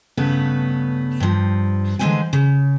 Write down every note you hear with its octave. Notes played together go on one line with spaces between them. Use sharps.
G2 C#3 A3 B3 B4
G2 F3
D3 E3 G#3 C#4 C5 G#5
C#3